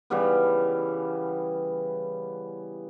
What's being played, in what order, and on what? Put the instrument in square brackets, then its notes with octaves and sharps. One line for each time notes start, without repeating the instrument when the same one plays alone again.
[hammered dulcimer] C#3 E3 G3 B3